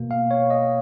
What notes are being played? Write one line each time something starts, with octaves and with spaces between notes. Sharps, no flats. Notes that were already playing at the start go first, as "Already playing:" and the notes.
Already playing: B2 A#3
F5
C#5
D#5